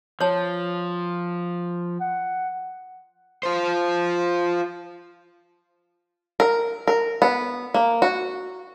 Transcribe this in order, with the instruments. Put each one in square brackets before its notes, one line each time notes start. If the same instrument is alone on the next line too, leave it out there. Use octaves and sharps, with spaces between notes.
[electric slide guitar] F3 [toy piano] C#5 A5
[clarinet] F#5
[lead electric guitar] F4 C5
[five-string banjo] A#4
A#4
B3
A#3
F#4